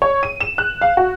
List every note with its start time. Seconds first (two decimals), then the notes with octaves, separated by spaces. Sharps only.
0.02 C#5
0.23 D#7
0.40 E7
0.58 F#6
0.81 F5
0.97 F#4